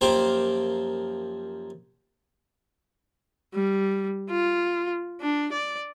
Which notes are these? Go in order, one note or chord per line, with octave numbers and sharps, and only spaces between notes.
F#2 F3 A#3 G4 C5 D6
G3
F4
D4
D5